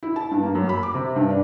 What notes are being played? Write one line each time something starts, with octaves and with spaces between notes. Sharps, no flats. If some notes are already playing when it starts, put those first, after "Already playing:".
E4
A5
G2
A#3
F#2
B5
D6
C3
G2
D4